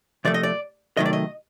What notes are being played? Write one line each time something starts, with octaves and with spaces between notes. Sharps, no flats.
C3 F3 A3 D5
D#5
D5
C3 D#3 F#3 A3 D#5
D5
D#5